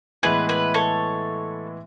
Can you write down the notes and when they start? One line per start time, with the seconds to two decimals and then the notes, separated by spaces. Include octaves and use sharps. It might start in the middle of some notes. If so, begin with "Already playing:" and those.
0.23 A2 E3 G#3 B3 E4 G#4 B4
0.49 G#4 B4
0.74 A4 C#5